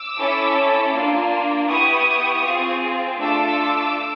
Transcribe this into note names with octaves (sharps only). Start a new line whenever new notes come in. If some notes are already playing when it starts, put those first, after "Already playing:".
Already playing: D6 E6
C#4 E4 A4
A#3 D4 F4
B3 E4 G4 C#6 D#6
C4 F4 G#4
A3 D4 F4 A4 D6 E6